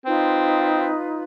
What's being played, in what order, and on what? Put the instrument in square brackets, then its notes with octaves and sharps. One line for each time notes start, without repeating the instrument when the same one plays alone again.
[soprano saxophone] C4 [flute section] D#4 F4 B4